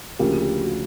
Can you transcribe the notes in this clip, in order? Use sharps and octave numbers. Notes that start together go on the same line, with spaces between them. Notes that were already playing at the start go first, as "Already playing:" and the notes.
D2 C#3 F3 A#3 G4
G4
F#4